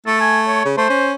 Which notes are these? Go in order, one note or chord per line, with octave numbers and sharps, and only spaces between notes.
A3 A4
G#5
C#5
C#3
A3 C5
C#4